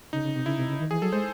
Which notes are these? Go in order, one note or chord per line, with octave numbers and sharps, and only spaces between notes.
C#3 D#4
C#3
C3
C#3 E4
C3
C#3
D#3
E3 G#4
F#3 A4
G#3 C5